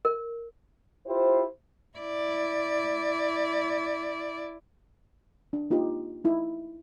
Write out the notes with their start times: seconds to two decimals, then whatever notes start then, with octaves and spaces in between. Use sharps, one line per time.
0.05 A#4
1.07 E4 F4 G4 C5
1.98 E4 D5
5.53 D4
5.70 A#3 D#4 F4 G4
6.24 D#4 E4